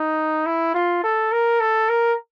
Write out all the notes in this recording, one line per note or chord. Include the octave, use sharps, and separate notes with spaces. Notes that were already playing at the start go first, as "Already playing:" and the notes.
Already playing: D#4
E4
F4
A4
A#4
A4
A#4